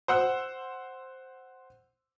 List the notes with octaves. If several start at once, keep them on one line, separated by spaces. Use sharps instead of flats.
C5 F#5 E6